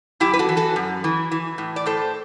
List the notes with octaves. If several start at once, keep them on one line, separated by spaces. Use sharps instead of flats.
F#2 E4 G4
B4
F#4 A4
E3
F#4 A4
F#2
E3
E3
A2
D5
A2 A4 C5